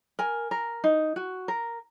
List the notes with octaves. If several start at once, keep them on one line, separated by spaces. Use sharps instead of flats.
A#4 G#5
A#4
D#4
F#4
A#4